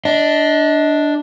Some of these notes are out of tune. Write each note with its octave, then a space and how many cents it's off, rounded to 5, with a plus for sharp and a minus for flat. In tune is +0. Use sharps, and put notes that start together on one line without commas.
D4 +0 D#5 +30